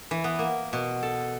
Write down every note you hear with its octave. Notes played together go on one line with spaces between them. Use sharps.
E3
B3
A#3
B2
A4